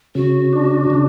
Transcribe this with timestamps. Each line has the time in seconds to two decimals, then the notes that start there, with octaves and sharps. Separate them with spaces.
0.15 C#3 F#4
0.53 D4
0.90 C#3